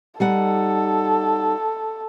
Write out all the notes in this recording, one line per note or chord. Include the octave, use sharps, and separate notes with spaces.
G3 D#4 A4 F#5